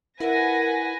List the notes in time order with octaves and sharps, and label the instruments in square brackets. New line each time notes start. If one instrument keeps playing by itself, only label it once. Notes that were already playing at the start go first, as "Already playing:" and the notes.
[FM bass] E4 [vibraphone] A#4 [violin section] B4 G#5 A#6 [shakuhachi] F#5